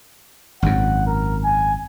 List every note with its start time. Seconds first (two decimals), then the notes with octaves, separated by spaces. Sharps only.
0.62 G#1 F#2 F#5
1.07 A#4
1.44 G#5